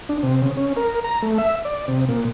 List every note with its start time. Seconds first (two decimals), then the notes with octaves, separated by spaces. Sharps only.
0.09 D4
0.23 C3
0.42 C#3
0.57 C#4
0.77 A#4
1.04 A#5
1.22 A3
1.38 E5
1.65 D5
1.88 C3
2.09 A#2